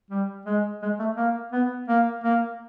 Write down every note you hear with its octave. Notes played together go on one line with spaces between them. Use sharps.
G3
G#3
G#3
A3
A#3
B3
A#3
A#3